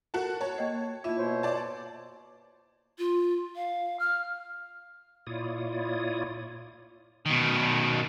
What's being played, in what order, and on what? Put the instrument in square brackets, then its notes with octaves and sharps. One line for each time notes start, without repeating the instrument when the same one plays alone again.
[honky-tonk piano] F#4 A5 [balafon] A4 A#4
[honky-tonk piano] C#5 A5
[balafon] A#3 D#5
[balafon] A#3 F4 [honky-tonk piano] E4
[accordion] B2 C5 C#5
[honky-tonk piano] D5 A5
[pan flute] F4
F5
F6
[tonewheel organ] A#2 E4 F4 C#5 D5 D#6
[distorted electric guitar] B2 D#3